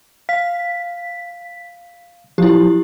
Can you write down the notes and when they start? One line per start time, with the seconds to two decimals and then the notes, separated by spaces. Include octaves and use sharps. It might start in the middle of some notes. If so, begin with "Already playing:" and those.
0.29 F5 B6
2.38 F3 F#3 E4 G4